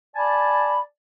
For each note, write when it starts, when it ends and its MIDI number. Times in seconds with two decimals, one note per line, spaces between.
0.16 0.78 74
0.16 0.78 80
0.16 0.78 81
0.16 0.78 83